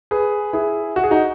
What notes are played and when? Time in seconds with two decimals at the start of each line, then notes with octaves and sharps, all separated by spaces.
0.11 G#4 B4
0.53 E4 G#4
0.96 F#4
1.04 G#4
1.11 D#4 F#4